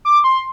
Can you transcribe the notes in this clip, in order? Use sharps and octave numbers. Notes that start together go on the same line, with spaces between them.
D6
C6